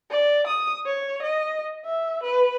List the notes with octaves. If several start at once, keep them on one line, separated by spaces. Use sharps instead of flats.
D5
D#6
C#5
D#5
E5
B4